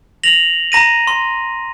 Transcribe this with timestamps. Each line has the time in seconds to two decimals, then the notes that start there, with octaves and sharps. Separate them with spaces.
0.24 A#6 F7 F#7
0.72 A#5 A#6 D#7
1.07 C6